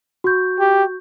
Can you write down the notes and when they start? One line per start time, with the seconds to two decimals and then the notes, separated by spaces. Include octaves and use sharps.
0.24 F#4 C#6 G6
0.60 G4